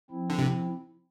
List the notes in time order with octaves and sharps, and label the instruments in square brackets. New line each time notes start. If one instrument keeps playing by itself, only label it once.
[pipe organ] F3 C4 E4
[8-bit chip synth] D3
C3